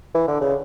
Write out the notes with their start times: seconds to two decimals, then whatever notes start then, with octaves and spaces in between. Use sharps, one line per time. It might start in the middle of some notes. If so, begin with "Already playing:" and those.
0.15 E3
0.28 D3
0.41 C#3